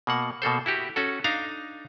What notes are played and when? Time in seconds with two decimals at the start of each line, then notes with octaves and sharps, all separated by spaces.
0.07 B2 A#3 F#5
0.42 B2 A#3 A4 C5
0.66 E4 F#4 G4
0.96 C#4 F#4 A4
1.24 D4 D#4 F5 A#5